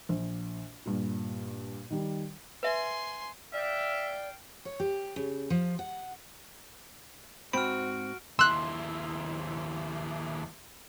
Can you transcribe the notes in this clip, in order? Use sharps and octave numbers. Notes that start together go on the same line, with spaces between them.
A#1
G2 A#2
D#3 G3
B4 E5 G#5 C6
D5 E5 F5 G5
C#5
G4
C#3
F3
F#5
G#2 C4 F#4 B5 F6 D7
D#2 E4 C6 E6 F#6